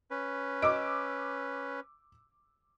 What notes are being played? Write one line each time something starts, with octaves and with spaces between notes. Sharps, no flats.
C#4 B4
D#5 D6 E6 D7